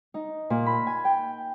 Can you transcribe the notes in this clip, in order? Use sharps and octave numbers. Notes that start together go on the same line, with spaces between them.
D#4
A#2
B5
G#5
G5